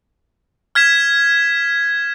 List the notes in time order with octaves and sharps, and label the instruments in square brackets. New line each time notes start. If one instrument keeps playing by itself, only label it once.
[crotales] F6 G#6 B6 E7